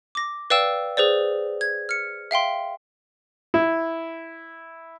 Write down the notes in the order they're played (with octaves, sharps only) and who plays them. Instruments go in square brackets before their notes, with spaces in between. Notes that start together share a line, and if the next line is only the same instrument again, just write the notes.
[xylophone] D6 A#6
B4 D5 F5 G5 E6 E7
G#4 B4 C5 D5
G#6
F6 C#7
E5 F5 G5 C6
[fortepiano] E4